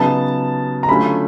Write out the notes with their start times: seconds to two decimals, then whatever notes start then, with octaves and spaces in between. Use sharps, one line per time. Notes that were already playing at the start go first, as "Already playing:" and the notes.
Already playing: C#3 F#3 B3 D#4 A5
0.83 A#5
0.88 D3 F#3 A3 C#4 F4 B5